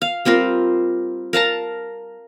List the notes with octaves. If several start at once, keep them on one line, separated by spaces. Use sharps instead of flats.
F5
G3 C4 F4 A#4
A#4 F5 A5 A#5